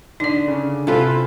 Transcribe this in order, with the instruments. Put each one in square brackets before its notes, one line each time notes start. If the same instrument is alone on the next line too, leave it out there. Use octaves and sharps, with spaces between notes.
[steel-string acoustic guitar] D3 [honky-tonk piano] D4 [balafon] D#4 D5
[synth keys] C#3
[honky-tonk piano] C3 [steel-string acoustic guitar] C#4 A4 [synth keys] E4 F4 B4